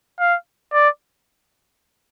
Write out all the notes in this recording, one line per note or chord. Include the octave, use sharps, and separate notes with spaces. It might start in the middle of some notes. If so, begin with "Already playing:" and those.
F5
D5